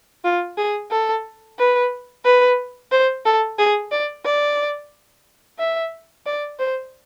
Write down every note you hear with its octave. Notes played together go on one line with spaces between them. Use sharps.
F4
G#4
A4
B4
B4
C5
A4
G#4
D5
D5
E5
D5
C5